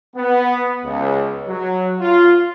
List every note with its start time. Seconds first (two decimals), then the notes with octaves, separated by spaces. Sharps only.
0.15 B3
0.84 C#2
1.47 F#3
2.00 F4